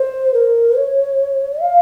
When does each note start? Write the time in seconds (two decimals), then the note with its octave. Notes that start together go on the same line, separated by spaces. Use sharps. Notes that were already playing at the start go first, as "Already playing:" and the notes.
Already playing: C5
0.34 A#4
0.76 C#5
1.61 F5